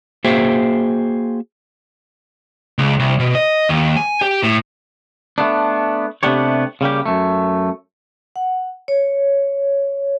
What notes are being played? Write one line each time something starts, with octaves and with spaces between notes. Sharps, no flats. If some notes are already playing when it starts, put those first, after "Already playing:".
A#3 F#4 G#4 C5 E5 G5
C#2
C2
B2
D#5
D#2
G#5
G4
A2
A3 B3 D4
C3 A3 B3 D4 G4 C#5
C#3 G3 A#3 G4
F#2 A3
F#5
C#5